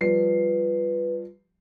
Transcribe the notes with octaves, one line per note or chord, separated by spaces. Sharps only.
F3 G3 B4 C7